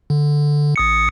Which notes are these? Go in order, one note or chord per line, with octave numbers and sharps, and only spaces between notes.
D3
A1 D#6 C#7